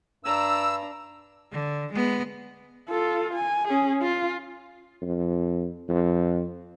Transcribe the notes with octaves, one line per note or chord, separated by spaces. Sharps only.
G2 D4 A#5 E6
D3
G#3 B3
F4 A4
G#5
C#4 G#4
F4
F2
F2